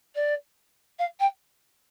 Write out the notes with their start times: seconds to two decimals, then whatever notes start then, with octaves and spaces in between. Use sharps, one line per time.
0.15 D5
0.99 F5
1.20 G5